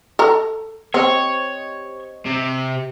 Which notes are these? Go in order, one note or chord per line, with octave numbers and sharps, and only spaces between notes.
A4 A#5
C4 G4 C5 C#5 D#5
C3